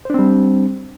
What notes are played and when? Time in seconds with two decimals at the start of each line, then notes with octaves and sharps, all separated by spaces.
0.05 C5
0.10 D4
0.14 C4
0.19 G3